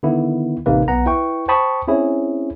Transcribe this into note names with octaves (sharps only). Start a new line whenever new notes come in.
D3 D#3 B3 E4
A1 C3 A#3 D#4 B4
B1 B3 F#5 A#5
E4 B4 G5 C#6
C5 G5 A5 B5 C#6 D#6
C4 C#4 E4 G#4 C#5